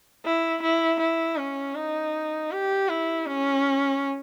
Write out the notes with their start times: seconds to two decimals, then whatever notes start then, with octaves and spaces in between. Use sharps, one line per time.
0.25 E4
0.62 E4
0.99 E4
1.37 C#4
1.75 D#4
2.51 G4
2.89 E4
3.26 C#4